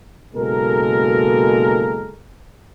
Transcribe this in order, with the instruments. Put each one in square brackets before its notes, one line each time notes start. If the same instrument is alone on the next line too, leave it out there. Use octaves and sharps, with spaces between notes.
[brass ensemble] F#1 B2 G#3 A#3 A4 A#4